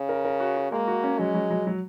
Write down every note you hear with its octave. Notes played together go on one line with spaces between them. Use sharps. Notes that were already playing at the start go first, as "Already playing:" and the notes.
Already playing: C#3
A#4
A#4
F#4
F#4
G#3 A#3
F#4
C#4
F#3 G#3
F#3
F#3
F#3